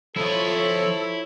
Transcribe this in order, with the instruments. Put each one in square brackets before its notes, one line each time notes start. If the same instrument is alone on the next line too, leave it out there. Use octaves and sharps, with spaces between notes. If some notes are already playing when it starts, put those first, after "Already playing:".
[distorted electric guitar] F3 D#5 [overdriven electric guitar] E4 [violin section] F4 C5 C#5 [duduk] A4